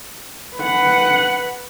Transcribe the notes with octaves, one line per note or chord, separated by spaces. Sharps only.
B4 F#5